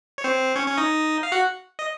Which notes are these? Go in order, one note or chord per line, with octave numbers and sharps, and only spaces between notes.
C#5
C4 C5
C#4 C#5
C#4 C#5
D#4 D#5
F5
F#4 F#5
D#5